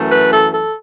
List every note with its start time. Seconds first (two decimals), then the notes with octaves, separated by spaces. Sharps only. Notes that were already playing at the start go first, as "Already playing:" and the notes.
Already playing: F#2 E3 A3
0.11 B4
0.32 A4
0.51 A4